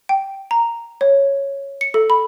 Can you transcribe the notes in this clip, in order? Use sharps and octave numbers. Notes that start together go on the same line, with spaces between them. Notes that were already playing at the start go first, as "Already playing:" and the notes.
G5
A#5
C#5
C#7
A4
B5